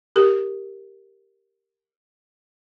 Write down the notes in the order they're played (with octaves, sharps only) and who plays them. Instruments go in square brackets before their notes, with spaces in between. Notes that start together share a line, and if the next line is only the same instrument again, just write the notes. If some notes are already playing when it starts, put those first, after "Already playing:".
[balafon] G4 A#4